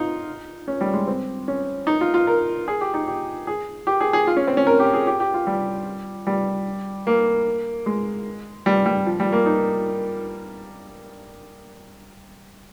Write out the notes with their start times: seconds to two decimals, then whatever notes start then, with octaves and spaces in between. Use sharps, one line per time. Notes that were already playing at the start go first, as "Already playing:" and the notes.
Already playing: D#4 F4
0.68 C#4
0.81 G3
0.94 G#3
1.07 C4
1.48 C#4
1.87 D#4
2.01 F4
2.14 F4
2.27 A#4
2.68 G#4
2.81 G4
2.94 D#4
3.08 G4
3.47 G#4
3.87 G4
4.01 G#4
4.13 G#4
4.27 F4
4.37 C#4
4.47 C4
4.57 C#4
4.67 A#4
4.80 G4
4.94 G#4
5.07 G4
5.20 G4
5.34 F4
5.47 G3
6.27 G3
7.07 A#3
7.86 G#3
8.66 G3
8.86 G3
9.06 F3
9.20 G3
9.32 A#3
9.46 D#4